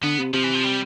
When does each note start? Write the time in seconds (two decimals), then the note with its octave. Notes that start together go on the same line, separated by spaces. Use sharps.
0.03 D3 B3
0.18 C3
0.33 C3 F3
0.44 E3
0.54 F3
0.64 G3